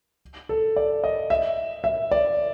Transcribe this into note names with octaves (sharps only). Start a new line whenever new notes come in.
A4
D5
D#5
E5
E5
D5